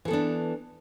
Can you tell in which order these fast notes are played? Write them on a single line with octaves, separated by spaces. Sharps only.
E3 A4 B3 D4